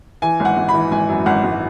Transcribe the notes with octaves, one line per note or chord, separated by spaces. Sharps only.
E3 G#5
G#1
F#5
G#1
B5
E3
G#1 G#5
F#2
G#1 F#5
G#1